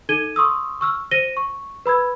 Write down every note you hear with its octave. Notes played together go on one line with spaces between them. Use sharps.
D#4 A4 G#6 D#7 G7
C6 C#6 D#6 E6
C#6 E6 F6
C5 A#6 D#7 G7
C#6
B4 B5 E6 G#6